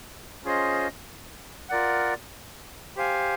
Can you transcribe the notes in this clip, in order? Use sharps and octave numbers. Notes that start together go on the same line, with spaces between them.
C#4 F4 G#4 C5 D#5
F4 A#4 D5 F#5
G4 C5 F5 G#5